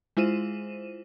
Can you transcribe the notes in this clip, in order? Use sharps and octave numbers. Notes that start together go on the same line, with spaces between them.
G#3 E4 F4 C5 D#7 E7